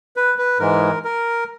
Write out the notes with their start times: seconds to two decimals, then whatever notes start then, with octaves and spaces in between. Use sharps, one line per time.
0.16 B4
0.38 B4
0.59 G#2 E3 G#3 A#4
1.04 A#4